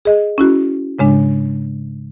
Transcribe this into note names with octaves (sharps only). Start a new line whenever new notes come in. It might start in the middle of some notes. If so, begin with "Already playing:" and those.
G#4 D#5
C#4 E4 F#4
G#2 C#3 G#3 D4